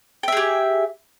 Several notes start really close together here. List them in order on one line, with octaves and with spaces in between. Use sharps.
G5 E5 G#4 G4